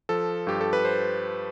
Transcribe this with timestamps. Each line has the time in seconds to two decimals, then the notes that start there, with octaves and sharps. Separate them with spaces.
0.09 F3 A4
0.47 G2 G4
0.61 A4
0.73 B4
0.85 C5